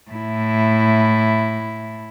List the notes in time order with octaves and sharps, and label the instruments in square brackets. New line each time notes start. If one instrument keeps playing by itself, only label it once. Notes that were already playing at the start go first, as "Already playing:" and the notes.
[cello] A2 E4